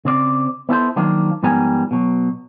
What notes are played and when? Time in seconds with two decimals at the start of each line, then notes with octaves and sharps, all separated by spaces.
0.05 C#3 C4 D5
0.69 B3 E4 A4 C5
0.96 D#3 F3 F#3 A#3 D4
1.43 G#2 F3 G3 B3 A#4 G#5
1.91 B2 F#3